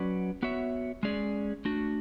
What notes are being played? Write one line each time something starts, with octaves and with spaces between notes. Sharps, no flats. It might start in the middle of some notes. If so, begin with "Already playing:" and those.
Already playing: F#3 C#4 F#4 B4 D5
B3 F#4 C#5 E5
G#3 C#4 G#4 D5
A3 D4 F#4